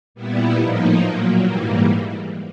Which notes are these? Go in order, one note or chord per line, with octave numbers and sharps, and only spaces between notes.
A#2 G3 B3 E4
A2 F3 A#3 D#4
A#2 F#3 A#3
G#2 E3 G3 A#3